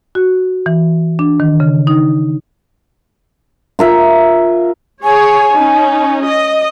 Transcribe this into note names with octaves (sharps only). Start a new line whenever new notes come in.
F#4
E3
D4
D#3
C#3
D#4
F4 A#4 E5
G#4 C#5 G#5
C#4 D#4
D#5